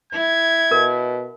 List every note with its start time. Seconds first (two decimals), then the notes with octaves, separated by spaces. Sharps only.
0.12 E4 G#6
0.71 B2 A#4